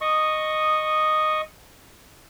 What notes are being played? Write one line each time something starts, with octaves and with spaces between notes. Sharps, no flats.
D#5 C#6 D#6